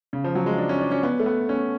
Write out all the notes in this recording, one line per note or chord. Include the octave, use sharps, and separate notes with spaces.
C#3
F3
F#3
G#3
D4
C#4
D4
C#4
B3
A3
B3
C#4